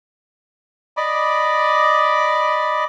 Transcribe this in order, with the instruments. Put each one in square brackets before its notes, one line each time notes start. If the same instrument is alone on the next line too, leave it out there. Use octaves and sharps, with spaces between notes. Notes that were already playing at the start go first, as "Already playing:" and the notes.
[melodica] D5 D#5 B5 D6